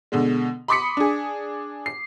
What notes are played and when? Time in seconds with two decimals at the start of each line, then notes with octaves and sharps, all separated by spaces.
0.12 B2 D3 G#3
0.68 B5 C6 D6 D#6 B6 C#7
0.97 D4 G#4
1.86 C7